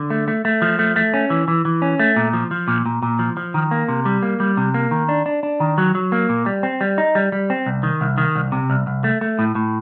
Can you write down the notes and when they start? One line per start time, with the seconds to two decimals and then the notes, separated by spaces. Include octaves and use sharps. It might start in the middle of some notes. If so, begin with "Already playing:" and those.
Already playing: D3
0.10 A3
0.28 A3
0.45 A3
0.62 F3
0.79 A3
0.96 A3
1.14 C#4
1.30 E3
1.48 E3
1.65 E3
1.82 C#4
1.99 A3
2.16 A#2
2.33 F3
2.51 F3
2.68 A#2
2.86 A#2
3.02 A#2
3.19 F3
3.37 F3
3.54 D#3
3.71 A#3
3.88 C3
4.05 G3
4.23 A#3
4.40 G3
4.57 C3
4.74 A#3
4.91 D#3
5.09 D4
5.26 D4
5.43 D4
5.60 D#3
5.78 F#3
5.95 F#3
6.12 A#3
6.29 A#2
6.46 G3
6.63 C4
6.81 G3
6.98 D#4
7.15 G3
7.32 G3
7.50 C4
7.66 C2
7.83 D#3
8.01 C2
8.18 D#3
8.36 C2
8.52 C3
8.70 C2
8.87 C2
9.04 A3
9.21 A3
9.39 A2
9.55 A2